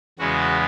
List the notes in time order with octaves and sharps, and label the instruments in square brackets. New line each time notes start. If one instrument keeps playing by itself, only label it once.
[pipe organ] E2 C#3 G#3 B3 F#4